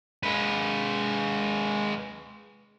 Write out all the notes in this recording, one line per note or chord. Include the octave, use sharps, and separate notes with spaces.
G#3 B4